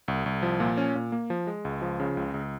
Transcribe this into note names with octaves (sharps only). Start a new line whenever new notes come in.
C2
C2
F3
A#2
C#4
A#2
A#3
F3
G#3
C#2
F3
C#3
C#2
C#2